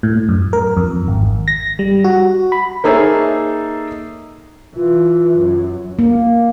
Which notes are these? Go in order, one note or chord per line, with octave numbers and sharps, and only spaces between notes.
A2
F#2
A#4
F2
G#1
A#6
G3
F#4
B5
A#3 D#4 G#4 A4 C#5 E5
E3 F4
F#2
A#3